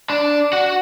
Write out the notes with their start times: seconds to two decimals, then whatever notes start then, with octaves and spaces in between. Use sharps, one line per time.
0.10 D4
0.53 F#4 F#5